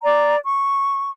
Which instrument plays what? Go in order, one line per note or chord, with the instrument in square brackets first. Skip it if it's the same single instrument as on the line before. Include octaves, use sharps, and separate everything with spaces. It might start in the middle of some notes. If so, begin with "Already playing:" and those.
[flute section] D5 A#5
C#6